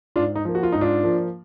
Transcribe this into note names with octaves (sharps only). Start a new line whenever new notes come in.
G#2 D4 F4
D#4
F3 A#3
F#4
F4
G#2 D#4
D4 F4
F3 A#3